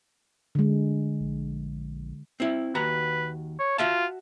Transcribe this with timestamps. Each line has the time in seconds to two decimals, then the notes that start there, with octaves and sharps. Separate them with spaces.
0.55 D3 G#3
1.20 A#1
2.40 C4 E4
2.75 D#2 F#4 B4 A#5
3.59 C#5
3.78 F4 F#4 E5 A5